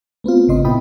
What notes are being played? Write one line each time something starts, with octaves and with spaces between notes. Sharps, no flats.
A3 B3 C4 F4
G#1 C#3 D#5 C6
A#2 B3 E4 G5 B5 D#6